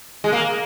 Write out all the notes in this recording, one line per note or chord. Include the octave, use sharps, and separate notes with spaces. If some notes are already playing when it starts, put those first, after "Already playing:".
G#3
A#3